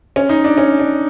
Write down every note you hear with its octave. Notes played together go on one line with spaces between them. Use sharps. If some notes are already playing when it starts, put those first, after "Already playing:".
C#4
D#4
D4
C#4
D4